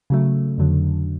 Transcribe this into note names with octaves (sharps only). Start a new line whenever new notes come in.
C#3 F#3 A3
F2 D3 F#3